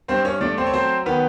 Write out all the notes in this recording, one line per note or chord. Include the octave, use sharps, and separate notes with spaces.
G2 C4 C5
C#4 C#5
A3 D4 D5
C4 C5
C#5
F#3 C4 C5
D#3 B3 B4